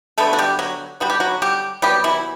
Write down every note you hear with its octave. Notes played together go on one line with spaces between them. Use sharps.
D3 G3 A3 B3 A4
F#4
G3 G4
F#3 F#4
D3 G3 B3 F#4
G4
F#3 F#4
G3 G4
C3 F#3 G3 B3 G4
E3 E4